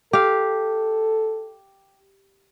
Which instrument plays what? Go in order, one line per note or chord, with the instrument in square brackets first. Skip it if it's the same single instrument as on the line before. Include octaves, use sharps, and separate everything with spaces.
[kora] G4 F5 [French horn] A4